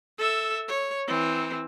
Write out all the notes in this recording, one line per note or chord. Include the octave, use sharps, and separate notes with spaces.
A4 E5
C#5
E3 C4